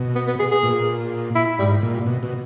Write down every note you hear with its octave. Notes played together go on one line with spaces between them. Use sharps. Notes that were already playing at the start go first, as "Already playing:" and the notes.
Already playing: B2
B3
B3
G#4
G#4
A#2
E4
G#2 G3
A#2
B2
B2